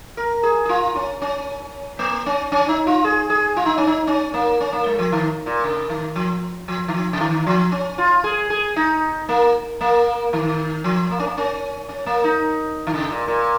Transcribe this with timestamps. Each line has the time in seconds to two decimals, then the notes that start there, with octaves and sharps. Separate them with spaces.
0.17 A#4
0.43 G#4
0.65 G#4
0.69 F4
0.96 C#4
1.22 C#4
1.99 A#3
2.26 C#4
2.52 C#4
2.69 D#4
2.87 F4
3.04 G#4
3.30 G#4
3.56 F4
3.66 D#4
3.78 C#4
3.87 D#4
4.07 C#4
4.34 A#3
4.61 C#4
4.72 A#3
4.86 G#3
4.99 F3
5.12 D#3
5.46 A#2
5.64 C#3
5.90 D#3
6.16 F3
6.68 F3
6.88 D#3
6.94 F3
7.13 C#3
7.20 D#3
7.47 F3
7.72 C#4
7.98 F4
8.24 G#4
8.50 G#4
8.76 D#4
9.29 A#3
9.81 A#3
10.33 D#3
10.84 F3
11.11 A#3
11.20 C#4
11.27 A#3
11.37 C#4
11.89 C#4
12.06 A#3
12.24 D#4
12.87 D#3
12.94 C#3
13.11 A#2
13.28 A#2